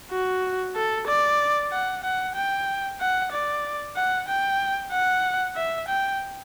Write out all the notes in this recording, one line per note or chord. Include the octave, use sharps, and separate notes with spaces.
F#4
A4
D5
F#5
F#5
G5
F#5
D5
F#5
G5
F#5
E5
G5